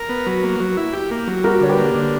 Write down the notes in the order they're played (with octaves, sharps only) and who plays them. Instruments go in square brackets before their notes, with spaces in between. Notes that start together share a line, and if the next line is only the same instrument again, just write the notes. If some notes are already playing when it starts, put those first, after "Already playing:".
Already playing: [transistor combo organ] A#4
B3
F#3
A#3
F#3
E4
G4
A#3
F#3
[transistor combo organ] G3 [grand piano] F#4 A#4
[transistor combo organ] D3 [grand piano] C#5
[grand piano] G4 B4
[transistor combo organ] A#3
D3